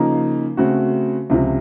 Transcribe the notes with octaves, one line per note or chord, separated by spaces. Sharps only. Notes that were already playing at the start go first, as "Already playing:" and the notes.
Already playing: C#3 F3 A#3 D#4
C#3 A3 C4 F#4
C#2 C3 F3